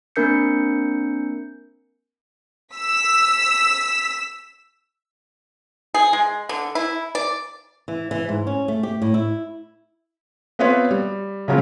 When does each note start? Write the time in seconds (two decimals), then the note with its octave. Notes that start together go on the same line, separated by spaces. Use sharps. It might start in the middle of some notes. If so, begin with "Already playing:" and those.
0.16 A#3 C4 D4 A#4 G6 C#7
2.75 E6 B6
5.94 G#4
6.13 G#3
6.49 D3
6.75 E4
7.15 D5
7.88 E3
8.11 E3
8.29 G#2
8.47 C#4
8.68 A3
8.83 G4
9.02 A2
9.14 E4
10.59 B3 C4 F4 B4 C#5
10.91 G3
11.48 C#3 F3 F#3 G#3 A#3 C#4